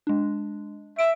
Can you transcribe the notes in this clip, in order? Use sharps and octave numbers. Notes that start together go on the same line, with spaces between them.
G#3 D4
E5 D7